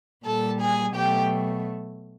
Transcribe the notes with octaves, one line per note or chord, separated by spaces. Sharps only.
A#2 G3 A4 A5
G#4 G#5
B2 F#3 A3 G4 G5